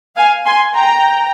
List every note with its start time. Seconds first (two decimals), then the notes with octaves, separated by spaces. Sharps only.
0.16 F5 G#5
0.45 G#5 C6
0.75 G5 A#5